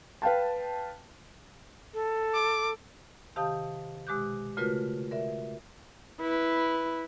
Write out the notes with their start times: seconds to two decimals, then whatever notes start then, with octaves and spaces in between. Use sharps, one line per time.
0.22 B4 F5 G5 A5
1.94 A4
2.34 D6
3.36 C3 D#3 G4 F5 A5 D#6
4.07 B2 G#3 G4 D6 F#6 G6
4.57 C#3 A3 F4 F#4 A#4 B4
5.11 A#4 D5 E5
6.21 E4 B4